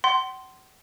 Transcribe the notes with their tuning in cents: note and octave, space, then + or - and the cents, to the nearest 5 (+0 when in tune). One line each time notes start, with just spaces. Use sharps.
F#5 +40 C6 +0